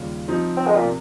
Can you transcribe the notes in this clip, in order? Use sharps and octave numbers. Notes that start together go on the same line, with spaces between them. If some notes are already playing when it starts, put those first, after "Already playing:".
Already playing: D#2 C#3 G3 C#4 F4
F3 C4 D#4
C4
G#3
A#2
C3